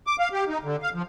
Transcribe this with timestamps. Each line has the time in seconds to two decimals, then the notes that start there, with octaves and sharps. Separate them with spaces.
0.07 D6
0.19 F5
0.32 G4
0.49 D#4
0.64 D3
0.83 F5
0.94 F3